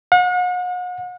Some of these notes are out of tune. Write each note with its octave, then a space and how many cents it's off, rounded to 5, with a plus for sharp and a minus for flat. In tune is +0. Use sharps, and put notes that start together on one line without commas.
F#5 -40